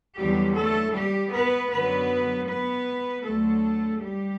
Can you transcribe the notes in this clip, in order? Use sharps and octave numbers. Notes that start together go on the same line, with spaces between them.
E2 D3 F#3 G3 G4
A3 A4
G3 G4
B3 B4
F#2 D3 F#3 B3 B4
B3 B4
D2 D3 F#3 A3 A4
G3 G4